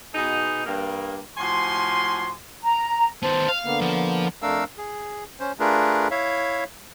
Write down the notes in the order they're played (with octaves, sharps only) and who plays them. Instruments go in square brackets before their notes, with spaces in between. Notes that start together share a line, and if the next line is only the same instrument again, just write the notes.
[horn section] B2 D#4 G#4
G2 A#3
A2 F3 F#4 G#5 C6
[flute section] A#5
[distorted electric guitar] D#3 B3 [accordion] C5 A5
[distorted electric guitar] F5
[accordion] D3 A#3 B3
[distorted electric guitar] F3
[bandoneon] F2 A3 D4 A#4 F5 E6
G#4
C#4 C5
A3 D4 F4 G#4 A#4 B4
E4 C#5 E5 F5